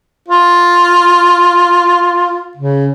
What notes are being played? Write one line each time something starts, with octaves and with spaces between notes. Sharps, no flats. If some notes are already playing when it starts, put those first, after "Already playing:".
F4
C#3